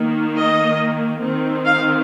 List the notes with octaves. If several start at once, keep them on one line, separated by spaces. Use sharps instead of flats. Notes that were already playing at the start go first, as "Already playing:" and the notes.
Already playing: D#3 A#3
D#5
D#3 C4
F5